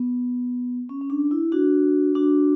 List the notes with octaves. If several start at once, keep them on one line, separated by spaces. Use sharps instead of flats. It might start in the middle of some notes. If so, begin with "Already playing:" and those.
Already playing: B3
C#4
C#4
D4
E4
D4 F#4
D4 F#4